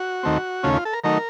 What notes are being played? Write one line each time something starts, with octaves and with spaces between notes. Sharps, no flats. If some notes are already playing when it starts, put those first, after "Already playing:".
Already playing: F#4
D#2 D#3 A3 C4
D#2 C#3 A3 C#4 F4
F4
A4
A#4
D#3 F#3 A3 D#4 A#4